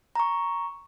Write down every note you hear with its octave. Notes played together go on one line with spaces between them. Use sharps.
A#5 C#6